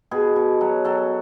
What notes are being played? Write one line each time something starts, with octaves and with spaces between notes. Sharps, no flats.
B2 G#4
B2
F#3
F#3 A4